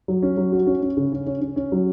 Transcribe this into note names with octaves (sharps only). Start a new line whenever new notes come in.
F#3
C#4
F#3
F#4
C#4
C#4
C#3
C#4
C#4
C#4
C#4
F#3